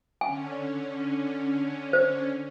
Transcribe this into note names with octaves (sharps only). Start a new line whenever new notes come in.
D3 C#4 G#5
C5